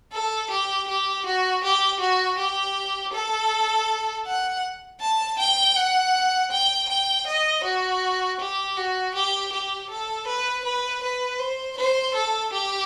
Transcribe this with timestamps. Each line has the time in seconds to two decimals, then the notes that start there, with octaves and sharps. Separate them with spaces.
0.13 A4
0.50 G4
0.88 G4
1.26 F#4
1.63 G4
2.00 F#4
2.38 G4
3.13 A4
4.27 F#5
5.01 A5
5.39 G5
5.76 F#5
6.51 G5
6.89 G5
7.27 D#5
7.64 F#4
8.40 G4
8.77 F#4
9.15 G4
9.52 G4
9.90 A4
10.27 B4
10.65 B4
11.03 B4
11.39 C5
11.77 C5
12.14 A4
12.53 G4